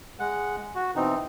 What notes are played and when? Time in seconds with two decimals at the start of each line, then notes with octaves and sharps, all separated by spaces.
0.20 G#3 F#5
0.75 F#4
0.96 B2 E3 C4 D#4